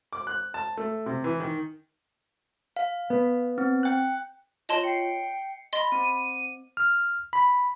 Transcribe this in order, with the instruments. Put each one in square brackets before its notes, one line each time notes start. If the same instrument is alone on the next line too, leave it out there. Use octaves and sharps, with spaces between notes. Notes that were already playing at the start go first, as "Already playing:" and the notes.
[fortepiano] D6
F#6
A5
A3
C3
E3
D#3
[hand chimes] F5
[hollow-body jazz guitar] B3
[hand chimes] C4
G5 F#6
[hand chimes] F4 C#5 [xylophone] D#5 A5 C6
[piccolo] G5 [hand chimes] C7 C#7
[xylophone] D#5 C6 [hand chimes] B5 A6
[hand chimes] C4 [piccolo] D#7
[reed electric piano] F6
B5